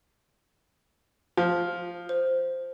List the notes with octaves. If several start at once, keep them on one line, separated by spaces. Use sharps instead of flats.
F3
C5